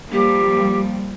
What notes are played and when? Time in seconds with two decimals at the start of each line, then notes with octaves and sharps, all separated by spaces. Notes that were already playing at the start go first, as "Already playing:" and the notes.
0.12 F3 G3 A#3 G4